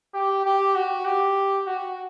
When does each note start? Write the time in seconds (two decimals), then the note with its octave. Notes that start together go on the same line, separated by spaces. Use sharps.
0.14 G4
0.46 G4
0.75 F#4
1.05 G4
1.66 F#4